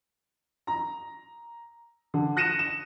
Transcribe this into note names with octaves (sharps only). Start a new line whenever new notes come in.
A#5
D3
F#6 A#6 C#7 D#7 E7
E7